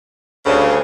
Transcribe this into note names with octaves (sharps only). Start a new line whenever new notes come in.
D2 G2 C#3